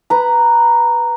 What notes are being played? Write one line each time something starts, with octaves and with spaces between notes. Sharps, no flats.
B4 A#5